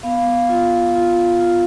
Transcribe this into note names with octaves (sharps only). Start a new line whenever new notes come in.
B3 F5
F4
F4
F4